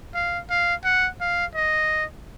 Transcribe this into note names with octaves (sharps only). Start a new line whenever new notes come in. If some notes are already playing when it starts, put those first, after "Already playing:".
F5
F5
F#5
F5
D#5